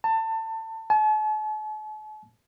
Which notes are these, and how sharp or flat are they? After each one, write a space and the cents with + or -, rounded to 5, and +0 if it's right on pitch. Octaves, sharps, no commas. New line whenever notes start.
A5 +25
A5 -45